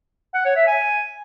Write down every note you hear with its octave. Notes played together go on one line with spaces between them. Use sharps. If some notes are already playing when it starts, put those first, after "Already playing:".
F#5
C#5
E5
G#5